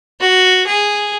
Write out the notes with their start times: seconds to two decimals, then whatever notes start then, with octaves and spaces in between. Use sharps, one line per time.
0.20 F#4
0.66 G#4